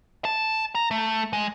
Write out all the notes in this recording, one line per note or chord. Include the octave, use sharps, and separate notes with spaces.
A5
A#5
A3
G#3